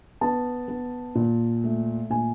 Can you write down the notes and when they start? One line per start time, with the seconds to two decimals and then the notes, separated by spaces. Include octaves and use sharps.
0.21 B3 A5
0.68 B3
1.15 A#2
1.64 A3
2.10 A#2 G#5